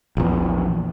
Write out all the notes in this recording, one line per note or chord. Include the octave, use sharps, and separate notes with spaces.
A#1 E2